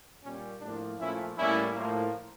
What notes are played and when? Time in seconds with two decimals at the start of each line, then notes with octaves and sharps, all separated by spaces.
0.22 A#2 G3 A#3 C#4
0.60 A2 F3 A#3 D4
0.98 A#2 F3 A3 C#4 E4
1.37 A2 G3 A#3 C#4 E4
1.75 A2 F3 A#3